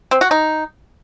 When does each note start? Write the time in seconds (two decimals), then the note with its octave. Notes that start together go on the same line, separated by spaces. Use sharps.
0.11 C4
0.21 F#4
0.31 D#4